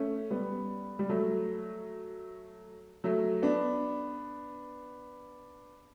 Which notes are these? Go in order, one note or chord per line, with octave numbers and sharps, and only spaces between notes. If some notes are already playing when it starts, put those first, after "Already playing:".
Already playing: A3 C#4
G3 B3
G3
F#3 A3
F#3 A3
B3 D4